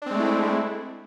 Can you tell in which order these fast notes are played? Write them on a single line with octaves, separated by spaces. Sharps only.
D4 C4 G#3 A3 E4